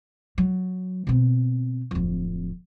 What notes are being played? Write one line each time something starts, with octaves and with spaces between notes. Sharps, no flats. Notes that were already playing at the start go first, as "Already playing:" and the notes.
F#3
B2 C4
D1 F2